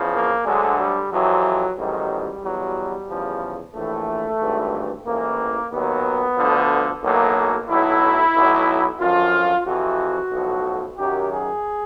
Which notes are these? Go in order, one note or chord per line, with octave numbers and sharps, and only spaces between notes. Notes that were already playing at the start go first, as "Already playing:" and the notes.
Already playing: E2 C#3 F3
A#3
D2 D3 F#3 G#3
G3
F2 C3 E3 F#3
A1 G#2 D#3 F#3 G3
E2 B2 F#3
E2 C#3 F3
A#1 A2 E3 A3
G#1 G2 E3
A1 G#2 E3 A#3
D#2 D#3 F#3 B3
D2 D3 F3
B1 A2 F#3 A#3
B1 A2 F#3 E4
B1 A2 F#3
F#2 D3 F3 F4
F2 C3 E3 F#4
B1 A2 F3
F#2 D#3 F#3 G4
G#4